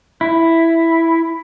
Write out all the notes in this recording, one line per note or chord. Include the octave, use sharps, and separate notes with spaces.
E4